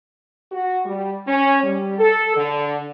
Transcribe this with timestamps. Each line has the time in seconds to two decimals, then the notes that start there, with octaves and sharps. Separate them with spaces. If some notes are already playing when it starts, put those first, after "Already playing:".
0.52 F#4
0.85 G3
1.27 C#4
1.63 G3
1.98 A4
2.36 D3